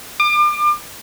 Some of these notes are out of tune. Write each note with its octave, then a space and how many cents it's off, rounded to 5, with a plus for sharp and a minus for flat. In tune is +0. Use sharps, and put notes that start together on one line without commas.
D6 +35